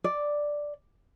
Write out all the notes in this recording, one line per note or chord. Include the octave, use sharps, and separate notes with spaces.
D5